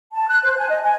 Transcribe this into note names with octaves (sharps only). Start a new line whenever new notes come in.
A5
F#6
C5
G#5
D#5
G#5